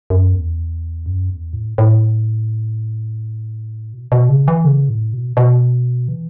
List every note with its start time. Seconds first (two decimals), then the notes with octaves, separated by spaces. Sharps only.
0.10 F#2
0.34 E2
1.06 F#2
1.30 E2
1.53 A2
1.78 A2
3.93 B2
4.12 B2
4.29 C#3
4.48 E3
4.64 C#3
4.89 A2
5.13 B2
5.37 B2
6.08 E3